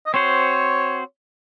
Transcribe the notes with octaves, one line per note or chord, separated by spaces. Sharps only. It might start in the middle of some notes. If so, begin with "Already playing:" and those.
D#5
C4 F#4 C5 C#5